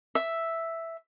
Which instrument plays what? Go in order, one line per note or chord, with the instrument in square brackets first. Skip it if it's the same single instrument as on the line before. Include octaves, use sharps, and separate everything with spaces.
[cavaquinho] E5